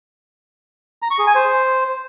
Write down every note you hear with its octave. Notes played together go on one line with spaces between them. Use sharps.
A#5
C#6
G#4
G#5
C5